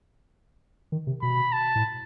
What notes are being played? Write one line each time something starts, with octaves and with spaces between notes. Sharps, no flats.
D#3
C3
B2 B5
A5
A2